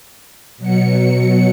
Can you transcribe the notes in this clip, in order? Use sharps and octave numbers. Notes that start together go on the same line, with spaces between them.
B2 F#3 C#7